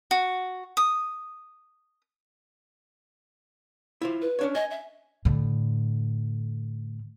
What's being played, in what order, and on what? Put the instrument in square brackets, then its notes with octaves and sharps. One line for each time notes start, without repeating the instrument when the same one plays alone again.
[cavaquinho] F#4
D#6
[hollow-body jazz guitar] E4 F4 C5
[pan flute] B4
[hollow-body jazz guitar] C#4 D4 C#5
[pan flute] D#5 [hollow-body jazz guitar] G#5
[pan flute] E5
[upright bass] A2 D3